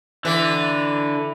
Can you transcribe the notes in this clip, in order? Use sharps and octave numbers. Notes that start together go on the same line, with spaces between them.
D3 E3